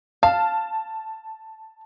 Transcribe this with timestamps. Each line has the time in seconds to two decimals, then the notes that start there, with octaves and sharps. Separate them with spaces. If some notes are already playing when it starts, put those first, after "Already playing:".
0.23 F5 A5